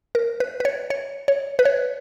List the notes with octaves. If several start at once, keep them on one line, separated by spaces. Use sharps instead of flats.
A#4
B4
B4
C#5
C#5
C#5
B4
C#5